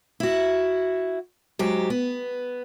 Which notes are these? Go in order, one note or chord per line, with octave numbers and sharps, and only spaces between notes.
E4 F#4
G#2 F#3 G4
B3